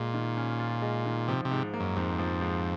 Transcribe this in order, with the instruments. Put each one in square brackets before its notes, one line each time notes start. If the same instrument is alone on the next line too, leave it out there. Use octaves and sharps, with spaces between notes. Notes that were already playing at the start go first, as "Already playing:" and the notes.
Already playing: [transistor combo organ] A#2 [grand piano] G#3
[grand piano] D#3
C#4
F4
G#3
D#3
[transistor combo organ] C3 [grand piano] F3
[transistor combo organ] C3
[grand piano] G#2
A#3
[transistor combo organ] F#2
[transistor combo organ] F2 [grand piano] G#2
[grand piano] F3
G#2